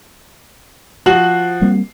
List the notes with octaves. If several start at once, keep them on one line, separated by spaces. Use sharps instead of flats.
F3 F#4 C7 F#7
G3 A#3 C4